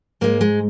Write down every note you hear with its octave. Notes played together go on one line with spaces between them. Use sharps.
G#2 G#3 A#3
G#3